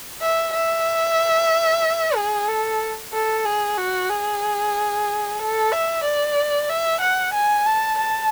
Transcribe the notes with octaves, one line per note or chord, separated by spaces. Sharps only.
E5
E5
G#4
A4
A4
G#4
F#4
G#4
A4
E5
D5
E5
F#5
G#5
A5
A5